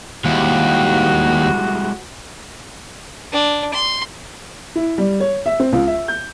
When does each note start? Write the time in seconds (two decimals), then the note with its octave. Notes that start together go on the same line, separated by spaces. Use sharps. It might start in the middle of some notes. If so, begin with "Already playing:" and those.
0.25 D#2 G3 G#3 E4 F#4
3.32 D4
3.74 C6
4.76 E4
4.98 G3
5.20 C#5
5.46 E5
5.60 C4
5.73 C#2
5.87 E5
6.08 G6